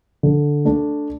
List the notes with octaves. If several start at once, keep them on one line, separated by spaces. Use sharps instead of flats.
D3
A3 D4